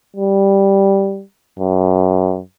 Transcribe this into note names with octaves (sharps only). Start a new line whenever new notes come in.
G3
F#2